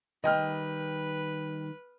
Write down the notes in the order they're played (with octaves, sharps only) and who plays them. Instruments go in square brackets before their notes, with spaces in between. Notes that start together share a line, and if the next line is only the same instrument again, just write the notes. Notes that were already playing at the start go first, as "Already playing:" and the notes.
[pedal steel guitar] D#3 G3 [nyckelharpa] B4 [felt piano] D#5 G5 F6